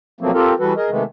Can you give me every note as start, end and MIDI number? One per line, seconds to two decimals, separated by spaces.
0.21 0.31 47
0.21 0.31 53
0.21 0.31 54
0.21 0.31 57
0.21 0.31 58
0.21 0.31 60
0.34 0.54 60
0.34 0.54 65
0.34 0.54 67
0.34 0.54 69
0.34 0.54 70
0.59 0.73 52
0.59 0.73 55
0.59 0.73 66
0.59 0.73 69
0.59 0.73 71
0.77 0.90 68
0.77 0.90 70
0.77 0.90 75
0.90 1.04 48
0.90 1.04 51
0.90 1.04 56
0.90 1.04 57
0.90 1.04 59